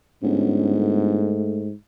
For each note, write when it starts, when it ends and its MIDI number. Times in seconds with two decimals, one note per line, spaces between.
0.23 1.30 31
0.23 1.73 44
0.23 0.74 61
0.78 1.70 57